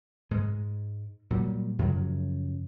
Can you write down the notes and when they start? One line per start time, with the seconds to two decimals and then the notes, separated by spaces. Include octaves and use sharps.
0.31 G#2 G#3
1.30 A#2 F#3 G3
1.79 F#2 C#3 F3 F#3